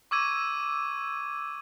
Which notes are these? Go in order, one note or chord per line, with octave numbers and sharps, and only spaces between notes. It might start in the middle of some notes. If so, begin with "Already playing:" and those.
C#6 D6 E6 G#6 D#7